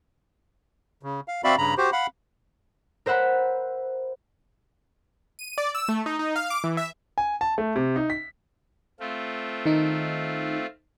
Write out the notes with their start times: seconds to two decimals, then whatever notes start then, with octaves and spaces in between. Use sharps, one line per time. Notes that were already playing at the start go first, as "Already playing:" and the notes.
1.03 C#3
1.28 F5
1.44 C4 F#4 D5 E5 F5 B5
1.58 G2 C#3 A#5 B5
1.78 F#4 G4 C5
1.92 F5 F#5 B5
3.06 A#4 C5 E5 F#5 B5
5.39 D#7
5.58 D5
5.75 E6
5.89 A3
6.06 D#4
6.19 D#4
6.36 F5
6.50 D6
6.64 E3
6.77 E5
7.18 G#5
7.41 A5
7.58 A3
7.76 C3
7.96 D#4
8.10 B6
9.00 A3 C4 F4
9.65 D#3 D#4